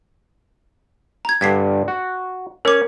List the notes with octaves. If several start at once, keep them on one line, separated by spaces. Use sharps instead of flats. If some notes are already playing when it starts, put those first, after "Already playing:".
A#5 G#6
G2 D3 G#6 B6 C7
F#4
C#4 A#4 C#5 D6